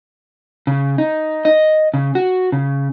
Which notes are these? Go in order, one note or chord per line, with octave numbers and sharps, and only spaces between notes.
C#3
D#4
D#5
C#3
F#4
C#3